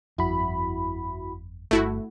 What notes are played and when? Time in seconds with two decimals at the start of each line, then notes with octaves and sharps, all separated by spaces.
0.18 G1 F2 E4 F#4 B5
1.71 G1 A3 E4 F#4